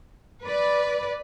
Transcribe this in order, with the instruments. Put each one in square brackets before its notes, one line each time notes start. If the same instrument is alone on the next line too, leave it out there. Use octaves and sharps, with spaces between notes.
[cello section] B4 D5